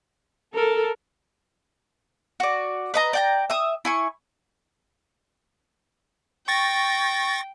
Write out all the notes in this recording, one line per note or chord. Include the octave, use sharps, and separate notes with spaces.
A4 A#4
F#4 D5
B4 D#5 A#5
D5 G5 A#5
E5 D#6
E4 G#5 C#6
G5 C#6 A6 A#6